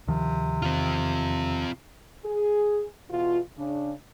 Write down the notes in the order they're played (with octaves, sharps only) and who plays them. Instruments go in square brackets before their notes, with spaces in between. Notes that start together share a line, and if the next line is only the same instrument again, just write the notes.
[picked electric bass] D2 D#3 F3 [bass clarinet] C3
[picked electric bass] E2 D#3 [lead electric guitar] C4 F4
[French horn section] G#4
E2 B2 F4
C#3 D4